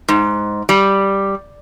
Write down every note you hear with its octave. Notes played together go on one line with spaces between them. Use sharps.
G#2
G3